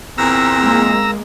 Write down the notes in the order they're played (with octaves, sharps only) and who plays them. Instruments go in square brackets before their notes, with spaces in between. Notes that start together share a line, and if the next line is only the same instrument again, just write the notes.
[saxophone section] E2 A#2 [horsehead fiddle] C4 [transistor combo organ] A#5 E6
[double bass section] G#3 A#3